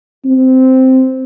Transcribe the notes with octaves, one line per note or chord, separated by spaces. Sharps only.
C4